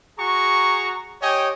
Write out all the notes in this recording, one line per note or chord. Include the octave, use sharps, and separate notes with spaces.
F#4 G#4 A#5 C#6
G4 C#5 D#5 G5 G#5